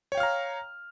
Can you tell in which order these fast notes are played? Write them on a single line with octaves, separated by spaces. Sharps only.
C#5 G5 F5 F6 A#5